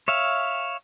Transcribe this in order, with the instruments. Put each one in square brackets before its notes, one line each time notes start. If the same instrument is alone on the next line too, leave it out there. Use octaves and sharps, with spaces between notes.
[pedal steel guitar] C#5 E5 F5